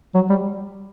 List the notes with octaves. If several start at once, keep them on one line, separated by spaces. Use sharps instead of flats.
F#3
G3